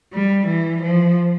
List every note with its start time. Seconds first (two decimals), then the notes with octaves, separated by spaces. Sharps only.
0.13 G3
0.48 E3
0.83 F3